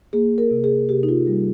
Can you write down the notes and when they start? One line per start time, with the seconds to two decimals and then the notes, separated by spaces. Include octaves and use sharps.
0.13 A#3 G#4
0.38 A#4
0.51 C3
0.64 G#4
0.89 C3 G4
1.03 D#4
1.09 F4
1.27 G3